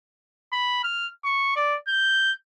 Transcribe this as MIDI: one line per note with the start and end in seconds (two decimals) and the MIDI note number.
0.53 0.83 83
0.83 1.08 89
1.24 1.52 85
1.56 1.76 74
1.88 2.32 91